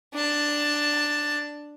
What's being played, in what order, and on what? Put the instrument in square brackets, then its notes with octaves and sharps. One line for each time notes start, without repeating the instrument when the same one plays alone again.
[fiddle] D4 A5